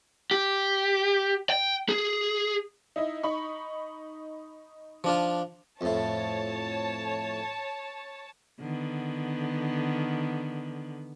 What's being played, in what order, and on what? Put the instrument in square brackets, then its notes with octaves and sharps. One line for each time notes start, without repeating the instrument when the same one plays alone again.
[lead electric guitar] G4
G5
G#4
[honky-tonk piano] D#4 E4 D#5
D#4 B5 C#6
[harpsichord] F3 D4 F4
[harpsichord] F2 A2 [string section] C#5 A5
[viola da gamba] D3 D#3 B3